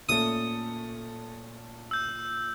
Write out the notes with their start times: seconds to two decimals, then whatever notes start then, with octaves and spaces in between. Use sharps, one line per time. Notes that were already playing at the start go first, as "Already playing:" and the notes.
0.09 A#2 A3 C#4 A4 D#6
1.91 E6 G6